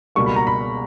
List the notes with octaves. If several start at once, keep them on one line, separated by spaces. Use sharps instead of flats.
C#2 B2 G3 A#3 C#6
B5
A#5
B5